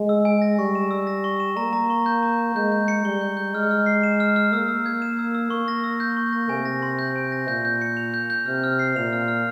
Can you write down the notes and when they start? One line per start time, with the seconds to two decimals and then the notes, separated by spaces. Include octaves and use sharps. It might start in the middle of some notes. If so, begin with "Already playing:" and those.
Already playing: G#3
0.09 E6
0.25 G#5
0.42 A#6
0.59 G3 C#6
0.75 E7
0.91 E6
1.07 A#6
1.24 C#6
1.40 E7
1.57 A#3 A#5
1.73 A#5
1.90 C#6
2.06 G6
2.23 A#5
2.39 A#5
2.56 G#3 G6
2.72 G6
2.88 C#7
3.05 G3 G7
3.21 G6
3.37 G6
3.54 G#3 F6
3.71 F6
3.86 C7
4.03 E7
4.20 F6
4.36 F6
4.53 A#3 E6
4.68 E6
4.86 G#6
5.02 E7
5.19 E6
5.35 E6
5.50 A#3 C#6
5.68 A#6
5.84 E6
6.00 G6
6.17 C#6
6.33 A#6
6.49 C3 G#5
6.65 A#6
6.82 C6
6.99 G6
7.16 G#5
7.32 A#6
7.48 A#2 G6
7.65 G6
7.82 C#7
7.97 F7
8.14 G6
8.30 G6
8.46 C3 F6
8.64 F6
8.79 C7
8.96 A#2 F7
9.13 F6
9.28 F6